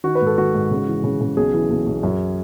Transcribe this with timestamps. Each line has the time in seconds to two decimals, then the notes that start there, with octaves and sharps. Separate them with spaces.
0.04 D#3 F#4
0.15 B4
0.21 G#2
0.26 A4
0.37 G#1 F#4
0.54 G#2
0.71 C#3
0.87 E3
1.04 C#3
1.21 C#3
1.37 B1 G#4
1.54 E3
1.70 B1
1.86 B1
2.03 F#2